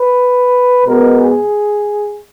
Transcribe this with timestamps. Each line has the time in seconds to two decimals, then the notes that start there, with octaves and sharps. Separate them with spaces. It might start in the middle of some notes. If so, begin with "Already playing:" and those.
Already playing: B4
0.86 B2 G#3 B3 A#4
1.18 G#4